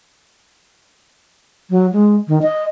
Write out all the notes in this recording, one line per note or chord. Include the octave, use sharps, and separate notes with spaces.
F#3
G#3
D#3
D#5